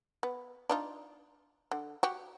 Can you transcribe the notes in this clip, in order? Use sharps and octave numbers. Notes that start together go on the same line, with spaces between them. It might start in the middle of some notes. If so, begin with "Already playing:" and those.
B3
D4 D#4 F4
D3
F#4 G4